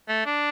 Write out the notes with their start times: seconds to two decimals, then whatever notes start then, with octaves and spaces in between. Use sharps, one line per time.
0.09 A3
0.26 D4